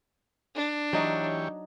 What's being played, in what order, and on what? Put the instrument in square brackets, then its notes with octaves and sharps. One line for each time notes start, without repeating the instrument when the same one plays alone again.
[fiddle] D4
[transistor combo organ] E3 G4 C#5 [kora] F#3 D#4